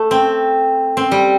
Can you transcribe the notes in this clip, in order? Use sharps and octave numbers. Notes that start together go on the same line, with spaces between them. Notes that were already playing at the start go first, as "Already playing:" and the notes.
Already playing: A3
C4
C4
G3